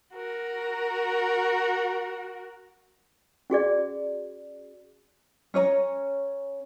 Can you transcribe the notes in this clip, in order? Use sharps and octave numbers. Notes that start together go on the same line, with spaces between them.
F#4 A#4
C#4 F#4 G#4 D5
C#4 C#5 D#5 A#5